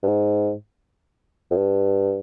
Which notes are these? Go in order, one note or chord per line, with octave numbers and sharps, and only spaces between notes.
G2
G#2
F2
G2